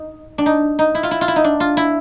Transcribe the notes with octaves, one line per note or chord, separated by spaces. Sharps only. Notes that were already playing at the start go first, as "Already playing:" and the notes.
Already playing: D#4
D4
D#4
D#4
E4
F4
E4
F4
E4
D#4
D4
F4
E4